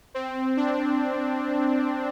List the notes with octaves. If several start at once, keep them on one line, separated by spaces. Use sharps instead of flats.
C4
D4